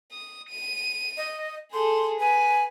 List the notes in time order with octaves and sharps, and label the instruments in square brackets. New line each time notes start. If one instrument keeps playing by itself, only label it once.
[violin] D#6
D#7
[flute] D#5
[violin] G#4 A4 [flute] C6
[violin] B4 [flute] G#5